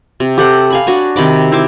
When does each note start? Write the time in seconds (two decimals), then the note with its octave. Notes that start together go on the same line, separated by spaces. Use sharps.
0.20 C3
0.38 G4 A4 C5 F#5
0.70 F5 G#5 B5
0.87 D4 F#4 C#5 G#5
1.16 C3 D#3 B5 D6
1.52 D#4 E4 C5 D6